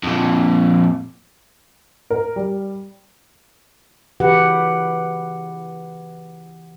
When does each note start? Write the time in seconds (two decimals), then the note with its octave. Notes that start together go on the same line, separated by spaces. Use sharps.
0.03 F2 A#2
2.10 A#4
2.36 G3
4.20 C#3 E3 G4 B4 F#5